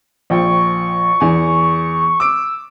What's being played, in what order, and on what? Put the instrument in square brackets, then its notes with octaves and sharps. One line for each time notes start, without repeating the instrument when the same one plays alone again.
[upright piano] A#1 F3 G5 [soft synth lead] C#6
[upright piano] E2 G#5
[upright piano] D6 D7 [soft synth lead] E6